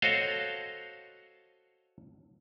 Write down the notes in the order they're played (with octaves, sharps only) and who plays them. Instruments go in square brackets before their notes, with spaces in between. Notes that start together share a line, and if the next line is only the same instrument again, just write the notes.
[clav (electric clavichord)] F#4 A4 C5 C#5 D#5 F5